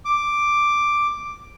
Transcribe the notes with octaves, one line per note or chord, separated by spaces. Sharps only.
D6